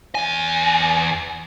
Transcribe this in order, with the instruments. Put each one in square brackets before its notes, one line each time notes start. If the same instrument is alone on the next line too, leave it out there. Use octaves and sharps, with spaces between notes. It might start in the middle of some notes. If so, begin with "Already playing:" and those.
[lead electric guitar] E2 G#5